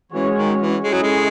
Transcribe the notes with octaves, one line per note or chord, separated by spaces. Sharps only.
E3 G#3 C#4 F#4 C#5
D#3
E3
G#3 C#4 E4 A4 D#5
F#3
G#3